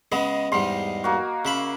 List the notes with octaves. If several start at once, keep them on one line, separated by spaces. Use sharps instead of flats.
C#3 G#3 B3 D#5
E2 G#2 G3 C6
A#3 F#4
C#3 E5 B5